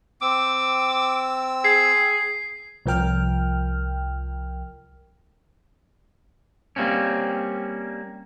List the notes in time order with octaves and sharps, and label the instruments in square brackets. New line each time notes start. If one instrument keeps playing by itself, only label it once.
[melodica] C4 E6 [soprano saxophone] D6
[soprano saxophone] G#4 [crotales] C7
[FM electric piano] C2 F3 A#4 G5 F6
[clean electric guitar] G3 A#3 C4 C#4